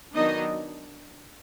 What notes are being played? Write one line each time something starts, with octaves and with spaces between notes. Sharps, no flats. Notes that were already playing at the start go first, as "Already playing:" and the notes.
D#3 F#3 B3 D4 D#4 D#5